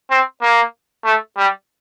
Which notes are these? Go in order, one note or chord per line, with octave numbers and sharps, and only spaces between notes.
C4
A#3
A3
G3